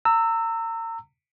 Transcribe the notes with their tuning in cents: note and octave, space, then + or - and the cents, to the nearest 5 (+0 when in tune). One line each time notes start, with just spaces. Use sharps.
A#5 -35 E6 +0